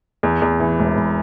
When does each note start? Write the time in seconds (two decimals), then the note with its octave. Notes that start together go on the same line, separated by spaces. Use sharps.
0.23 E2
0.42 E2
0.60 E3
0.79 E1
0.97 E1